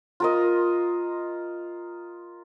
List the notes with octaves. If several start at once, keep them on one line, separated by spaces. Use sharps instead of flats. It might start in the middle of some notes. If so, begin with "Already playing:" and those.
F4 A#4 D#5